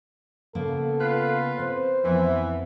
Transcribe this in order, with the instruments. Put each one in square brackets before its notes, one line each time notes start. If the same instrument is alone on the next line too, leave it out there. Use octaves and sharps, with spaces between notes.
[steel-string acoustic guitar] C#3 A#3 B3 [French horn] A4
[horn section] F4 B4 F5
[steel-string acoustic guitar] C4 [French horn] C5
[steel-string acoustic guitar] F2 B3 [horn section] E3